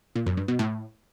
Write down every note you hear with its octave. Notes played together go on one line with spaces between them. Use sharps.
A#2
F#2
G2
B2
A2